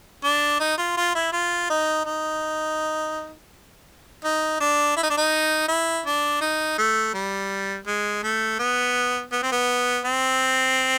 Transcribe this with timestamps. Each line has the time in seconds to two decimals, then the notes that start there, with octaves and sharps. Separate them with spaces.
0.24 D4
0.60 D#4
0.78 F4
0.97 F4
1.15 E4
1.32 F4
1.70 D#4
2.05 D#4
4.24 D#4
4.60 D4
4.96 E4
5.03 D#4
5.10 D4
5.17 D#4
5.68 E4
6.06 D4
6.41 D#4
6.78 A3
7.14 G3
7.87 G#3
8.23 A3
8.59 B3
9.32 B3
9.42 C4
9.52 B3
10.05 C4